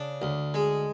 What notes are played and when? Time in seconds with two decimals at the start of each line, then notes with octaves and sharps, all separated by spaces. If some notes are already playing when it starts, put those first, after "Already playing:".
Already playing: C#3 D4
0.22 D2
0.54 G#3